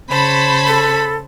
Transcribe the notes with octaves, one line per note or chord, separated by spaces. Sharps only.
C#3 C5 A5 B5 C#6 G#6
A4